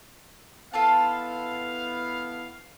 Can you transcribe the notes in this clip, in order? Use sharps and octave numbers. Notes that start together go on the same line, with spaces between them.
B3 E4 F4 A4 F5 A5